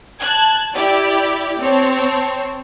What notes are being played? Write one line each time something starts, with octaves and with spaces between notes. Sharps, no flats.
A5 F#6 G#6
E4 G4 D5
C4 C#5 A5